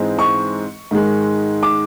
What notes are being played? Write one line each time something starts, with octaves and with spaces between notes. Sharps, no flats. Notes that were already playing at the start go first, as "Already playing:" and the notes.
Already playing: G#2 E3 G#3 C4 D#4
C#6
G#2 D#3 G#3
D6